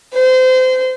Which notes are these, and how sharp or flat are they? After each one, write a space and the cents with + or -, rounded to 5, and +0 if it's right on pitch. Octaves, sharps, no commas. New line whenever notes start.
C5 -30